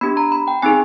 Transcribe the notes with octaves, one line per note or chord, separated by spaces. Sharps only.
B3 D4 G4 B5
A#5
B5
G5
C4 D#4 G#4 G#5